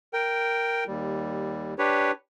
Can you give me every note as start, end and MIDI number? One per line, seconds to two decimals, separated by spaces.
0.13 0.84 70
0.13 0.84 79
0.87 1.74 39
0.87 1.74 55
1.78 2.11 62
1.78 2.11 67
1.78 2.11 71
1.78 2.11 73